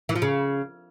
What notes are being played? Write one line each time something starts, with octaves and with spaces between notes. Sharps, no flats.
E3
F3
C#3